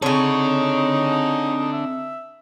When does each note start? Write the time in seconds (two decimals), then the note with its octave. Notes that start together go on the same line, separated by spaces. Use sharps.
0.02 C#3 C4 D4 D#4 A4 C#5
1.73 E5